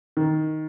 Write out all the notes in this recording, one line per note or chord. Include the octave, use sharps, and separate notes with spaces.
D#3